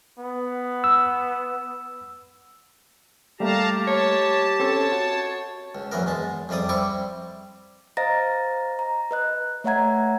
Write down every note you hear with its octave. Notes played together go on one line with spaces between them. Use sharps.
B3
E6
G3 A3 A#3 G4 F5 A5 A#5
C#5 A5
C4 C#4 A4 C#5
F#4
C#2
A#1 F#2 E3 B3 A#4
E2 G#3 A5
F2 C3 G3 D5 D#6
G3 C4 E4 C#6 D6
C5 D#5 F5 A#5 A6 A#6
A#5
B4 D#5 F#6
A3 C#5 E5 F#5 A#5 G#6